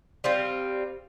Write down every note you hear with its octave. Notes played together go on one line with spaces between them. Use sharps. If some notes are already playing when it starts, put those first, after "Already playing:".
G3 C4 F4